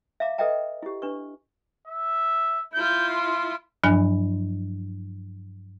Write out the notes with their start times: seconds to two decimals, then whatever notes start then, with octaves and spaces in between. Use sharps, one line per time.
0.20 E5 F5 A#5 D6
0.38 A4 B4 D#5 E5 G5 A#5
0.83 E4 G4
1.02 D4 B4 C#6
1.88 E5
2.74 E4 F4 G6
3.08 C6
3.83 G2 F3 F#3 D4 G#5